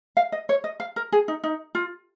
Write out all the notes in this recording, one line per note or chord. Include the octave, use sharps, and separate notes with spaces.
F5
D#5
C#5
D#5
F5
A#4
G#4
D#4
D#4
F4